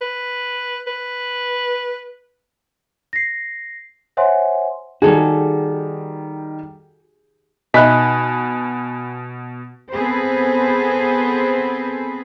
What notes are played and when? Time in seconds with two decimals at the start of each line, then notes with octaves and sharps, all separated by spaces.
0.01 B4
0.87 B4
3.13 A#6 C7
4.17 C5 C#5 E5 F#5 G#5 C6
5.02 D#3 G3 F#4 G#4 A4
7.74 B2 D#4 E5 G#5 B5 F#6 B6
9.91 B3 C4 G#4 A4 B4 C5